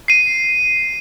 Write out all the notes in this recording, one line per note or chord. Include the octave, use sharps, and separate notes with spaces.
C7 D#7